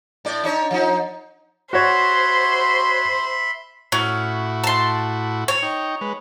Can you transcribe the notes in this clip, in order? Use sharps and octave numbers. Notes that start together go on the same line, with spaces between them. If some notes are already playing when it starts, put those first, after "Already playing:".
A2 D5
D4 D#4 C#5
F3 D#4
F#4 C5 C#5 E5 B5 C6
A2 C#4 E4 F#4
A5 C6
C#5
D#4 G5
G#3 B4